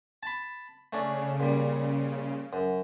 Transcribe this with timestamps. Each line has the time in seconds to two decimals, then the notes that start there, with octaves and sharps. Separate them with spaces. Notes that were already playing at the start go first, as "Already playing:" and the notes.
0.23 A5 B5
0.93 C#3 A3 C#4 D4
1.40 A#2 G3
2.53 F#2